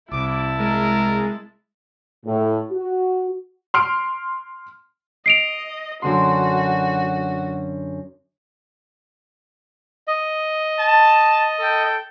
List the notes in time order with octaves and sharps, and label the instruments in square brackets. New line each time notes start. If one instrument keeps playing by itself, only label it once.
[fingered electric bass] C2 [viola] E4 A5 [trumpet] D6
[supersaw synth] G#3 [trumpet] A#4
[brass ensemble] A2
F#4
[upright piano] C6 F6 D7
[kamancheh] D#5 [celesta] C7 D7 F7
[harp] F#2 D3 C6 [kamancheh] F#4
[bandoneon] D#5
[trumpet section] A5
A4 G5